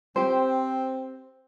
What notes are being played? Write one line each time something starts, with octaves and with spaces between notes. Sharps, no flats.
C4 G4 C5